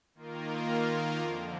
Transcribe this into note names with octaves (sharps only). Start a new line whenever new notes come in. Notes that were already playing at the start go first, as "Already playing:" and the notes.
D#3 A#3 F4 A#4
F2 D3 F3